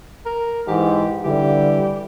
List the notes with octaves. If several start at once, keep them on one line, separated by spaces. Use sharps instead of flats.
A#4
G#2 E3 G4
D3 E3 G3 G4